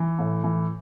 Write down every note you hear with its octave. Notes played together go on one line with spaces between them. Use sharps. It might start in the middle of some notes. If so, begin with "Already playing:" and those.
Already playing: E3
A2
E3